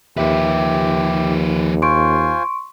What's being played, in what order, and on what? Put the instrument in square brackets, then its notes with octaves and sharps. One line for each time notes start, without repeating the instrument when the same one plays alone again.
[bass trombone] D#2 [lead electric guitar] F3 B4 [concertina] G4 [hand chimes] E5
[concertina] F4 C5 G#5 [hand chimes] C6 C#6 D7